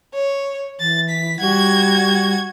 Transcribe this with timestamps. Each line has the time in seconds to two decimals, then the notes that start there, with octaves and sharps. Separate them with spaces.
0.14 C#5
0.80 E3 A6
1.09 B6
1.40 G3 F#4 G#6